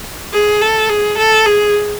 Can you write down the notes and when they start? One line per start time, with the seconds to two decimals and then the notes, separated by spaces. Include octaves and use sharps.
0.33 G#4
0.61 A4
0.90 G#4
1.18 A4
1.46 G#4